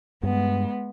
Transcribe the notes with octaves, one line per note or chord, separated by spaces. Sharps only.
G2 G#3 B3